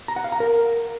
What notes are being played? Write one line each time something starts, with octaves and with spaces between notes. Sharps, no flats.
A#5
F#5
F5
A#5
A#4